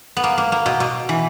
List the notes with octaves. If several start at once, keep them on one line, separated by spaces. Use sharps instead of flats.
B3
A#3
A#3
A#3
B2
B2
E3